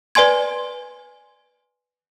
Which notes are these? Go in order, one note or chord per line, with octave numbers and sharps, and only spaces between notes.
B4 D5 G#5 C6 G#6